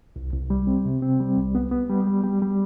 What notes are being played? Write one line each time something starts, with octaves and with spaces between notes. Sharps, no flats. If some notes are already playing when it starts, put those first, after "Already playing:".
C2
C2
G3
C4
C3
C4
G3
C2
B3
B3
G3
G3
G3
G3